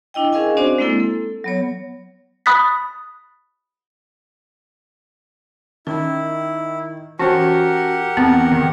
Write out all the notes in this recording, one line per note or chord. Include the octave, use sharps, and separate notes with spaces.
D4 E4 D#5 G5
C#4 G#4 A#4 D#5 F5 G#5
C4 D4 F#4 C5 D5
G#3 A#3 C4 E4 A4
A4
F#3 B3 C#5
B5 D#6 F#6 A6 B6
D#3 C#4 E4
E3 C#4 F#4 G4 A#4 F#5 A5
E2 B3 C4 A#5
D#3